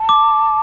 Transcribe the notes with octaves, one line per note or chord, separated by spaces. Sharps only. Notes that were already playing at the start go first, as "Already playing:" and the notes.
Already playing: A5
D6